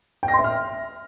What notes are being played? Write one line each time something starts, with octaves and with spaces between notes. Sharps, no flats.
G5
A#6
C6
E5
F6